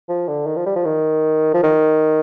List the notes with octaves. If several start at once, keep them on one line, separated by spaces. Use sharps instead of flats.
F3
D3
D#3
F3
G3
F3
D#3
F3
D#3